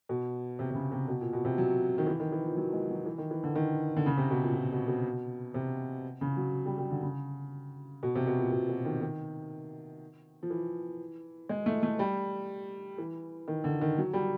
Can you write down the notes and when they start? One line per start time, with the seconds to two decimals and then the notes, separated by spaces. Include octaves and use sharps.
0.09 B2
0.59 C3
0.70 C3
0.75 C#3
0.92 C3
1.08 B2
1.21 A#2
1.33 B2
1.45 C3
1.58 F#3
1.98 D#3
2.07 E3
2.20 D#3
2.32 E3
2.44 F3
2.57 F#3
2.73 G#3
2.90 F#3
3.06 E3
3.18 D#3
3.31 E3
3.44 D3
3.56 D#3
3.97 D3
4.06 C#3
4.17 C3
4.31 B2
4.43 A#2
4.55 A#2
4.72 B2
4.88 B2
5.54 C3
6.21 C#3
6.37 F#3
6.66 G3
6.78 G3
6.91 D3
7.03 C#3
8.03 B2
8.15 C3
8.27 B2
8.39 A#2
8.52 B2
8.69 B2
8.85 D#3
9.01 D#3
10.43 F3
10.50 E3
11.49 G#3
11.66 A3
11.83 A3
11.99 G3
12.98 E3
13.48 D#3
13.64 D3
13.81 D#3
13.98 F#3
14.13 G3